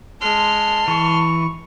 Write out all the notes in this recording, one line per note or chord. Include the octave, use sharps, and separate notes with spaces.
G#3 A5 C6 F6
E3 C#6